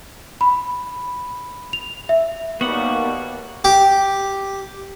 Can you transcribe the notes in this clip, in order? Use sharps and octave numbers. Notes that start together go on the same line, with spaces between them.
B5
F7
E5
D#2 G3 A#3 B3 F#4 F#5
G4